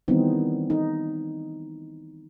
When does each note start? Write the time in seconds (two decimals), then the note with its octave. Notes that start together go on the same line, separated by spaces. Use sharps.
0.08 D#3 E3 G3 B3 C4 D#4
0.70 D#4